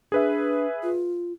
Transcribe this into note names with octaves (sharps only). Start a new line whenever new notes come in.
D4 G#4 B4 E5
F4